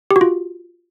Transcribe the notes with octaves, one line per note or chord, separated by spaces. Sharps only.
G4
F#4
F4